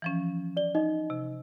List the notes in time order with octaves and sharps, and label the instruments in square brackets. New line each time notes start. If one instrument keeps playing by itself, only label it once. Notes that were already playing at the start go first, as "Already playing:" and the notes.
[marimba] E3 F3 C#4
[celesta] D5 G7
D#4 D#5
[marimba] C3